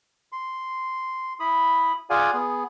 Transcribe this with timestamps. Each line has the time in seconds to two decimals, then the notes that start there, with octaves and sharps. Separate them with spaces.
0.32 C6
1.40 E4 B5 D#6
2.10 F4 G#4 D5 F5 F#5 G#5
2.34 B3 G#4